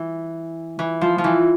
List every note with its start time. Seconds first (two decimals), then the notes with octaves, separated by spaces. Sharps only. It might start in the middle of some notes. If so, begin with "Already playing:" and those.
Already playing: E3
0.79 E3
1.01 F3
1.18 F3
1.24 E3